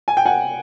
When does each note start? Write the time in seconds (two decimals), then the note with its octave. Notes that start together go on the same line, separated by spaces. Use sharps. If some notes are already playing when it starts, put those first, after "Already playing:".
0.08 G#5
0.17 G5
0.26 F#5 G#5